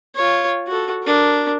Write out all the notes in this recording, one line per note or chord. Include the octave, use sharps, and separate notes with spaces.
F4 C#5
F#4 A4
D4 A#4